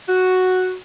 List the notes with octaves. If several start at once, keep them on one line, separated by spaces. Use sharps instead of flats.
F#4